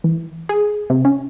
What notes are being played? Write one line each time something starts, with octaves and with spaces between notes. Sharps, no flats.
E3
G#4
C3
C#4